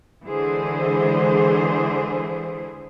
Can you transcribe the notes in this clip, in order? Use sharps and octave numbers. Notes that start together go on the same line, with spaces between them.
D3 E3 G#3 D4 G#4 C5